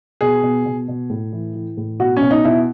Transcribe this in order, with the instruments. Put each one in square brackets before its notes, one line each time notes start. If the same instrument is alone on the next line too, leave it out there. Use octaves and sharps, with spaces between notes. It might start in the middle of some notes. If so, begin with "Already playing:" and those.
[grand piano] B2 G#4
B2
B2
B2
A2
E3
E3
A2
B2 F#4
B2 C#4
D#4
B2 E4